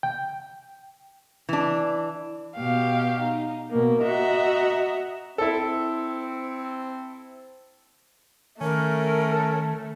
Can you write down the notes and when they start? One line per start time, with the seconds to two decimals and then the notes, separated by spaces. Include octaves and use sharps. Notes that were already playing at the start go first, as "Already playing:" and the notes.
0.03 G5
1.49 E3 D4
2.54 B2 G4 F5
3.20 D#4
3.71 B2 A#3
4.01 F#4 D#5 E5 A#5
5.38 C4 E4 A4
8.61 D#3 A3 C#4 A#4